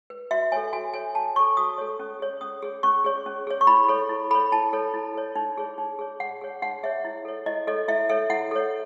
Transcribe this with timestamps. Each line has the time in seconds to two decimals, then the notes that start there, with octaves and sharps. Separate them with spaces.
0.10 B4
0.31 F#4 E5
0.52 A4 C#5 G#5
0.73 F#4 G#5
0.94 A4 C#5 G#5
1.15 F#4 A5
1.36 C#5 C#6
1.39 A4
1.57 F#4 D#6
1.78 A4 C#5
1.99 C#4
2.20 G#4 C#5
2.41 C#4 D#6
2.62 G#4 C#5
2.83 C#4 C#6
3.04 G#4 C#5
3.26 C#4
3.47 G#4 C#5
3.61 C#6
3.67 E4 B5
3.88 A4 C#5
4.09 E4
4.31 A4 B5
4.35 C#5
4.52 E4 A5
4.73 A4 C#5
4.94 E4
5.15 A4 C#5
5.36 D#4
5.57 G#4 C#5
5.78 D#4
5.99 G#4 C#5
6.20 D#4 F#5
6.41 G#4 C#5
6.62 D#4 F#5
6.83 G#4 C#5 E5
7.05 E4
7.25 A4 C#5
7.46 E4 D#5
7.67 A4 C#5 D#5
7.88 E4 E5
8.09 A4 C#5 E5
8.30 E4 F#5
8.51 A4 C#5